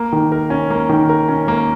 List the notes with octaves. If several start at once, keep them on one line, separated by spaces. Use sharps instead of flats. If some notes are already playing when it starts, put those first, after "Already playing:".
Already playing: A#3
D#3
A#4
C#4
A#3
D#3
A#4
C#4
A#3